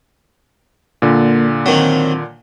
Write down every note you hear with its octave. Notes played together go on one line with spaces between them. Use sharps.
A#2 D3 A#3
D#3 F#3 C4